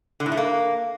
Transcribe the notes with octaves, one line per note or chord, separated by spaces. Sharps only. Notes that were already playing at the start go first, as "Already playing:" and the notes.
D3
A2
A3
A#3